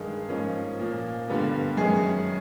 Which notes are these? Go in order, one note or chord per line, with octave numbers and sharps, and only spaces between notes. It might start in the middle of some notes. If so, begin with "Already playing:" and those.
Already playing: G2 D#3 G#3 G#4
G#2 F3 A#3 C#4
A#2 F3 A#3
G2 D3 G3 B3
F#2 D#3 G#3 C#4 G#4